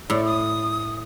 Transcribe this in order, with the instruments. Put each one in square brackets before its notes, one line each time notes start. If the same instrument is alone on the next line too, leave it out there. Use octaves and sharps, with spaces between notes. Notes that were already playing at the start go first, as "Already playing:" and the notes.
[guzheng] A2 [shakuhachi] D5
[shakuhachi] D#6